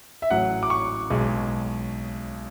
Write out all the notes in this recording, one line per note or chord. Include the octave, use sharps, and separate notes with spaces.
E5
A1 A2 F#3 F#5
D6
C#6
B1 B2 G#3